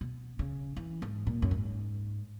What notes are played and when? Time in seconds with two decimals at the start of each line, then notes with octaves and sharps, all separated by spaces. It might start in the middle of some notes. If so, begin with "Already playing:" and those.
0.01 B2
0.39 C#3
0.76 E3
1.02 G#2
1.27 A#2
1.42 F#2
1.51 G#2